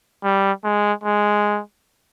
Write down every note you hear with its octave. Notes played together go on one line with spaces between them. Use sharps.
G3
G#3
G#3